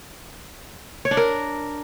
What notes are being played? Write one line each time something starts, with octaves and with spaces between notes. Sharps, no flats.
C#5
D4
A#4